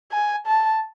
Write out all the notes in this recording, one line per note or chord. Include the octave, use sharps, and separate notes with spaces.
G#5
A5